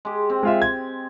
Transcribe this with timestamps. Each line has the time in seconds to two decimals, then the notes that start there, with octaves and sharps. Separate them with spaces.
0.05 G#3 G4
0.30 C4
0.43 G#3 F4 E5
0.62 G#6